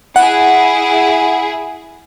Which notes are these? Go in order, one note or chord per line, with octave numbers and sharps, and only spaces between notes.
E4 G#4 F#5